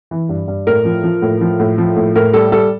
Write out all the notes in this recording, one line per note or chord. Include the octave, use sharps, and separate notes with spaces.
E3
G2
G2
A2 A#4
F3
F3
A2
F3
A2
F3
A2
A2 A#4
G3 A4
G3 A4